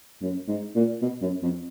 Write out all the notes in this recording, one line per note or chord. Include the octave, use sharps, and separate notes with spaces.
F#2
G#2
A#2
B2
F#2
F2